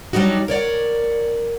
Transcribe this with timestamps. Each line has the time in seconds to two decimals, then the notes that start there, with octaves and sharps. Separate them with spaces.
0.13 F#3 G3 D4 D#4 F#4
0.48 A#4 C#5 D5 F#5